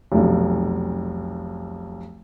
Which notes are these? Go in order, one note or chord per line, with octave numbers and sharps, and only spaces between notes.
F1 B1